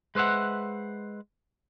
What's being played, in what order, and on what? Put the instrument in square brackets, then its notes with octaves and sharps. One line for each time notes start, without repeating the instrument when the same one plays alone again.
[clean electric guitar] G#3 B4 C5 E5 F#5